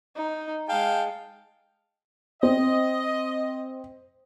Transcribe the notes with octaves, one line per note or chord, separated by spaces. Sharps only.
D#4
G#3 F5 G5 A5
C4 D#5